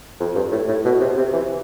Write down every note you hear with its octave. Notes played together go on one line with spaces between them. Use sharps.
F2
G2
A2
A2
B2
C3
C3
E3